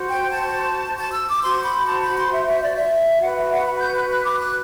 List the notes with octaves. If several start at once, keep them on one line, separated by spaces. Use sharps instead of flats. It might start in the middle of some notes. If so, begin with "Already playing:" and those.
Already playing: F#4 C5
G5
A5
A5
E6
D6
F#4 C5 C6
B5
A5
B5
C6
E5
E5
D5
E5
F#4 B4 F#5
E5
F#5
B5
G6
F#6
F#6
D6
F#6